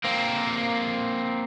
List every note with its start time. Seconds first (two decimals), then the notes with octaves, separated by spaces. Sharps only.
0.05 A#3 C4